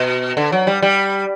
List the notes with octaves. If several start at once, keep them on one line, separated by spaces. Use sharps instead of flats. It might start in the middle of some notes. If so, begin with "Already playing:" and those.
Already playing: B2
D3
F#3
G3
G3